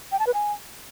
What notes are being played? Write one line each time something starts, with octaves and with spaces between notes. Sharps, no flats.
G5
A5
B4
G#5